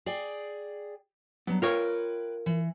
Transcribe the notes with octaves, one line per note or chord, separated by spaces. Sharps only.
G#4 D5 G5
G2 F#3 B3
F4 A#4 B4 C#5 G5
E3